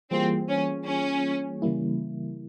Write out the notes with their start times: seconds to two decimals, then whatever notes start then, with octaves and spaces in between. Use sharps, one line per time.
0.11 E3 G3 A#3 C4 F4 G#4
0.48 C#4
0.87 C#4
1.62 C#3 E3 G3 A#3 E4